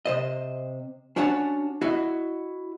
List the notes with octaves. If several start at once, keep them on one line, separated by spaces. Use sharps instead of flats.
C3 C5 D#5
C#4 D4 F#4 C#5 F#5 A5
E4 F#4 D#5